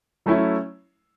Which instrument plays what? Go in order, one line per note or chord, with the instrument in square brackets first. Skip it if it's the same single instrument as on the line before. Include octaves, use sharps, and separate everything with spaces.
[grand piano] F#3 A3 C#4 E4